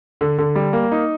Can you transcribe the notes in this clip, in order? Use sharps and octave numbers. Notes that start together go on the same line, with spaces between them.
D3
D3
G3
A#3
D#4